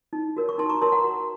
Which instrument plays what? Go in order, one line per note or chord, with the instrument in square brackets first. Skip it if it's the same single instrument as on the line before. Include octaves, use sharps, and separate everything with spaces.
[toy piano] D#4
F#4 A#4 C#5
C#6
D#4 A5 C6
A#5 C#6
F#4 A#4 C#5 A5 C6
F#5 A#5
F#4